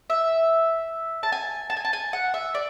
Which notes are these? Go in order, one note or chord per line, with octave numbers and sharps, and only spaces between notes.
E5
A5
G#5
A5
G#5
A5
G#5
F#5
E5
D5